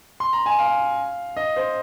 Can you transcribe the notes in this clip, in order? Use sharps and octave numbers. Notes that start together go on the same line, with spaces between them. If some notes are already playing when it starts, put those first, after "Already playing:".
C6
A#5
G#5
F5
D#5
C5